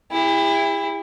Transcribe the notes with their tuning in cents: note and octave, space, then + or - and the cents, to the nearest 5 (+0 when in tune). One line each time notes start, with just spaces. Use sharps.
E4 +0 G4 +45